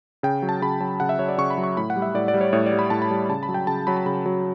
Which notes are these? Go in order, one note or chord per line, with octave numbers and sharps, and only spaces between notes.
C#3 G5
F#3
A5
C#3 B5
F#3 A5
C#3 F#5
E5
F#3 C#5
D5
C#3 C#6
B5
F#3
C#6
A2 B5
F#5
G3
E5
A2 D5
D5
G3
C#5
A2 C#5
D5
G3
B5
A2 A5
B5
G3
C#3 A5
B5
F#3
G5
C#3 A5
F#3 B5
A5
C#3 B5
F#3